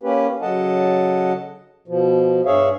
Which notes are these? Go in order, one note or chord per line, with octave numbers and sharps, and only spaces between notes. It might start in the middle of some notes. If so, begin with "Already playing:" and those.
A#3 C#4 G4 B4
C#3 F#3 A4 D#5 F#5 A5
B2 F3
G2 G#4 C#5 E5 F5